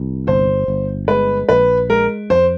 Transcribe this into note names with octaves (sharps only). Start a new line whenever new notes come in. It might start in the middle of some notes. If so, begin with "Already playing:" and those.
Already playing: C2
G1 C5
G1
G#3 B4
A#1 B4
G#3 A#4
F2 C5